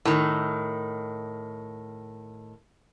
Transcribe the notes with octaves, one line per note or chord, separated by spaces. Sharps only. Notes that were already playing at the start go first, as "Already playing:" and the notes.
A2 D#3